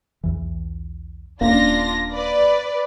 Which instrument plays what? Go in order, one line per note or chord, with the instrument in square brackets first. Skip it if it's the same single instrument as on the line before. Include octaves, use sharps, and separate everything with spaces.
[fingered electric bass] B1 E2 E3
[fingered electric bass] D#1 C#4 [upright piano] A#3 [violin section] D4 F4 A#6
[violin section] B4 D5